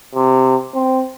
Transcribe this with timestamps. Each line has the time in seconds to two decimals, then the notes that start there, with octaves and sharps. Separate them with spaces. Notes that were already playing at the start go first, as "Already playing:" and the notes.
0.15 C3
0.74 C4